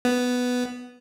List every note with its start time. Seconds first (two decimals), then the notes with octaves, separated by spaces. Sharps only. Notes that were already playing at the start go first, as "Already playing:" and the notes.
0.05 B3